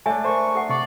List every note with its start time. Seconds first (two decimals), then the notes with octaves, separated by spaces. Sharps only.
0.06 A3 D4 C#5 E5 G#5
0.24 A#4 C5 C#6
0.55 A4 F#5
0.69 C3 D5 C#6